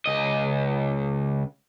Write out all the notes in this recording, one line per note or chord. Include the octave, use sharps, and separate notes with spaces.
C#2 D#5